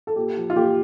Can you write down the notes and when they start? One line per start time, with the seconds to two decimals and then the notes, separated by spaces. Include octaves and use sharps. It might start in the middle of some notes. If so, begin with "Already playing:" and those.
0.07 A4
0.16 A#2 G4
0.37 F3
0.50 F4
0.56 A#2 G4